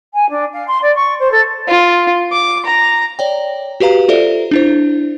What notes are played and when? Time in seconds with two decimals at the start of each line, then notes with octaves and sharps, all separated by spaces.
0.14 G#5
0.30 D4
0.53 F5
0.67 C6
0.82 D5
0.95 C#6
1.19 C5
1.31 A4
1.68 F4
2.32 D6
2.65 A#5
3.19 C#5 D5 G5
3.80 F#4 G4 B4 F5 A#5
4.09 F4 A4 C5 D5 E5
4.51 D4 E4 C5